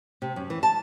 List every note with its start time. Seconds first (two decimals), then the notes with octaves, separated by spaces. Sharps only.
0.22 C3
0.36 F#2
0.50 E3
0.63 A5